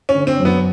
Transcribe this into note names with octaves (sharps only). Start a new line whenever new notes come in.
C#4
D3
C4
F#2
B3